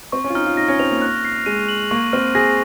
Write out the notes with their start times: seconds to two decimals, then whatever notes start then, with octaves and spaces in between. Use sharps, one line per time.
0.12 C4 C#6
0.24 C#4
0.30 F4
0.35 D#4 F6
0.46 F4
0.57 D#4 A#6
0.68 C#4
0.79 C4 F7
0.91 A#3
1.02 F#6
1.25 C7
1.46 G#3 D#7
1.69 F#7
1.91 A#3 C#6
2.13 C4 F6
2.35 G#4 A#6